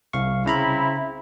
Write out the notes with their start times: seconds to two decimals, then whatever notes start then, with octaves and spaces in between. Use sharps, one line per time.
0.13 C2 F5 C#6
0.46 C#3 C4 E4 A#5 B5